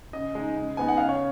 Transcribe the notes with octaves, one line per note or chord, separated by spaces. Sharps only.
C#3 D#5
G#3 D#4
C#3
G#3 B3 D#4 G#5
F#5
C#3 F5
C#5